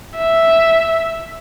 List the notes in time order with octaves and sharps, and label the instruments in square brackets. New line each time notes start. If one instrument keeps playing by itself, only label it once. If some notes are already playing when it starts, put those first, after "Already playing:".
[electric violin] E5